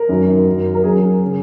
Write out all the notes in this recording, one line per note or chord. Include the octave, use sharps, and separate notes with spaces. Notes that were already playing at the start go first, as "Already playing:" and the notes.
Already playing: A#4
F#2 D#3 F#3
F#2 F#3
A#4
F#2 F#3 G#4
C#3 F#3